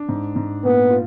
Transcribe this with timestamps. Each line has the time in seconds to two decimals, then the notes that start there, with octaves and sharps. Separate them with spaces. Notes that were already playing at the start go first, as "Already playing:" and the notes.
Already playing: D4
0.09 G#2
0.36 G#2
0.64 A#2 B3
0.90 F4